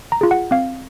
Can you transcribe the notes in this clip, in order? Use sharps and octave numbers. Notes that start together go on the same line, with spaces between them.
A#5
F4 G#4
F#5
C4 F5